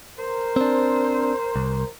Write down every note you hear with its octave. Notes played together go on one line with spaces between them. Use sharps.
A#4 C5
C4 D4
C2